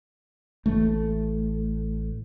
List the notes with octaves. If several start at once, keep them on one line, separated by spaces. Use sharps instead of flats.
A1 A3